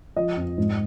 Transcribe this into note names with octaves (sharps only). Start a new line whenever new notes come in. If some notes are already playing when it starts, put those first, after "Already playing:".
F3 D#5
F2
G#2